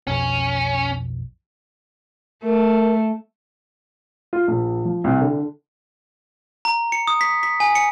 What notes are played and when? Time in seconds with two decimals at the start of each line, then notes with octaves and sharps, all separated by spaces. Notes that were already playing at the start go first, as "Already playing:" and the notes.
0.07 B1 F2 C#4
2.43 A3 A#4
4.33 F4
4.48 A#1
4.85 F3
5.04 C2
5.21 D3
6.65 A#5
6.92 C#7
7.07 D#6
7.21 B6
7.43 B6
7.60 G#5
7.75 C#7